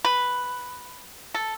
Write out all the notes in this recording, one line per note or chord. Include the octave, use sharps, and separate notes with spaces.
B4
A4